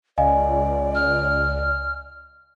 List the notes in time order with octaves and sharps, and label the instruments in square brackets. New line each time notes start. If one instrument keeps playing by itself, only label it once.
[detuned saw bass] C#2 [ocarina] D5 [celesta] D#5 F5 G#5
[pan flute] F6